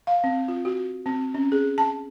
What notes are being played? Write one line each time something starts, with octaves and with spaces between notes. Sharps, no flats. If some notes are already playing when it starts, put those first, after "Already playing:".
F5
C4
F4
F#4
C4
C#4
G#4
A5